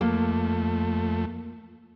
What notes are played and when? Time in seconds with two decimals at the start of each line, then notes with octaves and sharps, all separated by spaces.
0.01 F2 A3 A#3